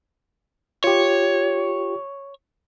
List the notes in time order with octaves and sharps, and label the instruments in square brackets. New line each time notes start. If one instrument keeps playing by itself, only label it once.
[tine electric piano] F4 G4 [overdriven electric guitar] C#5